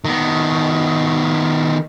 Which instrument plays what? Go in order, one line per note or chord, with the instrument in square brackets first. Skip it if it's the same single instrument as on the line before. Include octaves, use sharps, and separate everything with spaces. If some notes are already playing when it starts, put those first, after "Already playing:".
[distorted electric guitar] D#3 B3